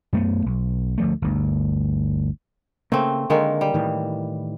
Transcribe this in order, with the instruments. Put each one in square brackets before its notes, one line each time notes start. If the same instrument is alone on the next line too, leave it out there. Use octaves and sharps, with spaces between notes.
[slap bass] F#2 A3 B3
B1
D2 F3 A3
G1 D2
[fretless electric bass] C#3 A#3 [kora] A3 C4
[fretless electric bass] D3 [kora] D#3 G#3 A#3
[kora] G3
[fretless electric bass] A2 D#3 E3